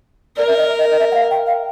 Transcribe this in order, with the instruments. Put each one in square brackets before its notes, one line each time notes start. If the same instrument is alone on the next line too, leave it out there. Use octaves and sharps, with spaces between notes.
[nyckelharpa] A#4 [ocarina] D5
[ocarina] E5
D#5
D#5
D#5
E5
F#5
F5
G5
F5